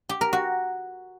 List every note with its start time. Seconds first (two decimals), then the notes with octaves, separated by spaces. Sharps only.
0.09 G4
0.21 A#4
0.33 F#4